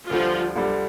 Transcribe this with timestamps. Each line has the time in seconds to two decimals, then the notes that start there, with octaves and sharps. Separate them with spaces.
0.11 D2 D3 F3 G3 F4
0.56 D2 D3 G3